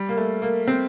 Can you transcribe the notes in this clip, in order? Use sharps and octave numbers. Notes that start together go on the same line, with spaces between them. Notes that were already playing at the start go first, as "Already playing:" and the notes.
Already playing: G3
A#3
A3
A#3
C4